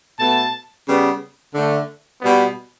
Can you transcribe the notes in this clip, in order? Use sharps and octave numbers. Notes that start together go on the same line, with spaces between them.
B2 A3 A5
C#3 G3 B3
D3 A3
B2 G3 B3